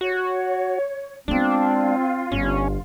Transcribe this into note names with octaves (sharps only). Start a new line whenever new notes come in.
F#4 C#5
G#3 B3 C4 D4 F4
G1 C#4